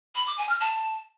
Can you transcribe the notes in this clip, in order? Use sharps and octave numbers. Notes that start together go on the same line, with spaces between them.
B5
D6
G#5
F6
A5